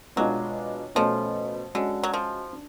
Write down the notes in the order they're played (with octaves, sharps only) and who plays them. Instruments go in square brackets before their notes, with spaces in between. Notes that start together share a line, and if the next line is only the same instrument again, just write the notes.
[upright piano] B2 G#3 D4 F4 [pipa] F#3
[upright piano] B2 A3 C#4 [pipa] F3
[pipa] D3 [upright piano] G#3 C#4 F#4
[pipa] F#3
F3
[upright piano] D4